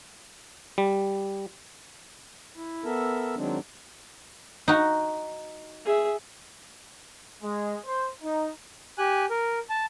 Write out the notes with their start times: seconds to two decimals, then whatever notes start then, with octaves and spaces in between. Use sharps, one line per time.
0.78 G3
2.56 E4
2.84 B3 A4 A#4 E5
3.37 D#3 F#3 G#3 C4 D4
4.68 D#4 F#4
5.85 G#4 E5
7.42 G#3
7.85 C5
8.23 D#4
8.98 G4 G#5 F#6
9.30 A#4
9.70 A5